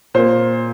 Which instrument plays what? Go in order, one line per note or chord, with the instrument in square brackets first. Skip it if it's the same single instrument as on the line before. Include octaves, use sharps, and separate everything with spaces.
[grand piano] A#2 A#3 C5